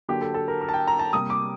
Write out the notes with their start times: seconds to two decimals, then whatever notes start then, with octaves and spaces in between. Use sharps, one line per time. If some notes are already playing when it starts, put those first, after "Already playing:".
0.08 D3 F#3 A#3 G4
0.21 A4
0.34 A4
0.48 A#4
0.61 A#4
0.69 A5
0.74 G5
0.88 A#5
0.99 A5
1.12 C3 G3 A#3 D#6
1.30 D6